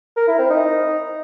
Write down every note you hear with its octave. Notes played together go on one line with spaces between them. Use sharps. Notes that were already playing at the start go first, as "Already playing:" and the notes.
A#4
E4
C4
D#4